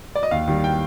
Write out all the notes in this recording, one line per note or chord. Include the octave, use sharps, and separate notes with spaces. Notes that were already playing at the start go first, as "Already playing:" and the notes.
D5
D#5
D#2 F5
D#3 G3
G5